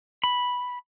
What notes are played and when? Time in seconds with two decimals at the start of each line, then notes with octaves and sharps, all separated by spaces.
0.24 B5